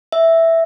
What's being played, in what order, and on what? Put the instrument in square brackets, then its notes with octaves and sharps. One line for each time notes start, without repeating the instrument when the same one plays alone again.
[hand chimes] E5